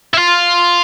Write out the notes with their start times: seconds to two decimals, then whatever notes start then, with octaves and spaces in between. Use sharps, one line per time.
0.14 E4
0.18 F4